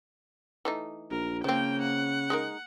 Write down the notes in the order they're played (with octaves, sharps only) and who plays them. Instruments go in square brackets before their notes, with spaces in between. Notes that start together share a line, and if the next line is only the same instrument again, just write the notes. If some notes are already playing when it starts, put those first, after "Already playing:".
[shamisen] E3 A3 D#4
[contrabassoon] A#1 [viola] A#4
[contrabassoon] C#3 [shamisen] F3 C4 [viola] A#3 G5
[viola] F#5
[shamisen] G#3 D#4 A#4